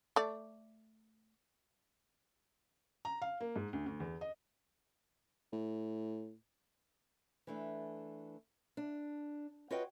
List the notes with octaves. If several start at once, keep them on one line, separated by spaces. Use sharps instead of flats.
A3 D5
A#5
F5
A#3
G#2
D2
D2
E2
D#5
A2
E3 A3 D4
D4
F4 F#4 B4 C#5 D#5 G5